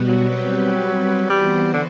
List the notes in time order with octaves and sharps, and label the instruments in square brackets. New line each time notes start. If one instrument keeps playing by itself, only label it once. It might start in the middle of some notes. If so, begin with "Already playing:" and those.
Already playing: [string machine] B2 G3 B3 F#4
[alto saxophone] F#3
[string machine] G3 C4 G4 B4
[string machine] E3 B3 F#4 C5 [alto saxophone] G3
[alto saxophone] D3